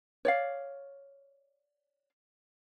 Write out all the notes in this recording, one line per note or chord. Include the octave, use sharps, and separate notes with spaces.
C#5 D5 F5